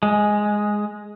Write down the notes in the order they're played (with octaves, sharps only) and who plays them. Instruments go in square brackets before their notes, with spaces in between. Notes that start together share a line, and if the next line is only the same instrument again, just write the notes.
[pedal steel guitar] G#3